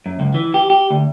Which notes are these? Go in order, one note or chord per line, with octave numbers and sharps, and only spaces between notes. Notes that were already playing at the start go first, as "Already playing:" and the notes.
F#2
C#2
E3
G4
G4
D2